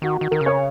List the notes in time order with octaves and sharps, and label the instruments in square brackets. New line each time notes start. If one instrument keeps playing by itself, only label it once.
[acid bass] D#3 [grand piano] F#4
[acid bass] D#3 [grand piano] F#4
[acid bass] D#3 [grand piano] A#4
[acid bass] C#3
[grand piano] C#5